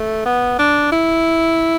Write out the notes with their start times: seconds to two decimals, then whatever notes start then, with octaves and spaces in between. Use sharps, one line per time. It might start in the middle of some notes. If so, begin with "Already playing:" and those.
Already playing: A3
0.25 B3
0.59 D4
0.92 E4